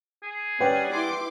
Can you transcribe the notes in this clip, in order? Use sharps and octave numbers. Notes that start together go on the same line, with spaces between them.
G#4
G3 C#4 B4 D5 F#5 G5
E4 C6 D6